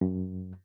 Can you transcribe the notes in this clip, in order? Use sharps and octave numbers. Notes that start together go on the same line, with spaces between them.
F#2